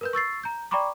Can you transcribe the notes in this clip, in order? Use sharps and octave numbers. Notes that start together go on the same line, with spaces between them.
A#4 B4 G6
C#6 E6 A6 C7
A#5 G6
D5 G5 A#5 B5 C#6 D6